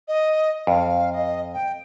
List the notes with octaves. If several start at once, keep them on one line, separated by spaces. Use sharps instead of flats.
D#5
F2 F5
D#5
G5